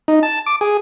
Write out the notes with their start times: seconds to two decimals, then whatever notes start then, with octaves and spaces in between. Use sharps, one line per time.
0.08 D#4
0.23 A5
0.46 D6
0.61 G#4